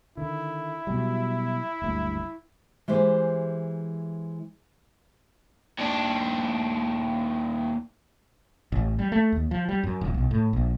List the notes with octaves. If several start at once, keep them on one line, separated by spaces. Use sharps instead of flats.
D3 D#3 E4
B2 F#3 G3
F#1 D2 G2
E3 G#3 G4 C5
D#2 D4
A1
G3
A3
D#2
F3
G3
F#2
D1
B1
A2
A#1